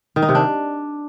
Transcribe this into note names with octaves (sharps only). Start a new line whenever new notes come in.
D#3
D#4
C3
D4